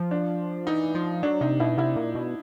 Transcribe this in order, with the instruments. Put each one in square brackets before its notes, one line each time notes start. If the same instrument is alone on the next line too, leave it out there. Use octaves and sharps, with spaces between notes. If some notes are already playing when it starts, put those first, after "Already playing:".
Already playing: [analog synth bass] F3
[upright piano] D4
[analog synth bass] E3 [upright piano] D#4
[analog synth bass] F3
[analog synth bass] F#3 [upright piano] D4
[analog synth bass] C3 [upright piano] D#4
[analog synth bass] B2 [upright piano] E4
[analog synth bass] C3 [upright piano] E4
[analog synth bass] A#2
B2